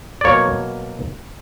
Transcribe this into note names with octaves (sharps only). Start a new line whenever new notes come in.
D5
B2 F#3 A#3 C#5